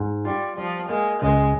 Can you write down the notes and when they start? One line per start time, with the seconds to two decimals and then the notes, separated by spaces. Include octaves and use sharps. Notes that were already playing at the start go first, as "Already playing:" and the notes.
Already playing: G#2
0.25 G3 F4
0.57 F3 G3
0.89 G#3 A#3
1.21 C#2 G#3